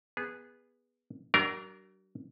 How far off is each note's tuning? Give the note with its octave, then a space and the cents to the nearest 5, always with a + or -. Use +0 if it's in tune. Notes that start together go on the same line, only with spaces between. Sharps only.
B3 -5 G#4 -15
F#3 +45 D4 +0 A#4 +0